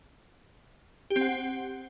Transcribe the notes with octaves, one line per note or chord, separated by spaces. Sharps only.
G4
C4
F#5